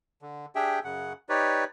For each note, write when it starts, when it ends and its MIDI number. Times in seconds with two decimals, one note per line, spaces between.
0.22 0.46 50
0.55 0.79 62
0.55 0.79 67
0.55 0.79 68
0.55 0.79 76
0.55 0.79 79
0.84 1.13 42
0.84 1.13 49
0.84 1.13 78
1.29 1.64 63
1.29 1.64 67
1.29 1.64 71
1.29 1.64 73
1.29 1.64 74